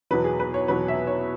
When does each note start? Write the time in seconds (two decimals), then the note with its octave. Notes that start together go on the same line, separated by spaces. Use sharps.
0.11 E2 B2 F#3 B4
0.24 G#4
0.40 B4
0.54 C#5
0.68 E2 B2 F#3 B4
0.88 E5
1.07 C#5